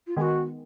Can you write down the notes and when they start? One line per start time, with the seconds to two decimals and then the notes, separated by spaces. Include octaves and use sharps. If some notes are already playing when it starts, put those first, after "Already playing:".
0.07 F4
0.17 D#3 G#3 B3 G#4
0.21 F#4